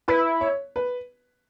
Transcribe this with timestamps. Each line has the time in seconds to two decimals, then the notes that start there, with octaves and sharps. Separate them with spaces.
0.08 E4 B4
0.41 C#5
0.76 B4